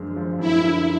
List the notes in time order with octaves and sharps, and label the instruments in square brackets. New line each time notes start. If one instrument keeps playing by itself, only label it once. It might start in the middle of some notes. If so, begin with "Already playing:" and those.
Already playing: [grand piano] F#2 D3 F3 G#3
F3
[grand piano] F#2 [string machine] E4
[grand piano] D3